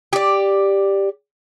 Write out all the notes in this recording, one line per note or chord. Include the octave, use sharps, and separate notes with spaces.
G4 D5